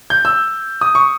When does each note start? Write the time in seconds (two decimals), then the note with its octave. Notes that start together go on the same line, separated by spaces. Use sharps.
0.10 G6
0.25 E6
0.81 D#6
0.95 C#6